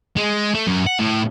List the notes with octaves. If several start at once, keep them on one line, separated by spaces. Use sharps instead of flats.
G#3
A3
F#2
F#5
A2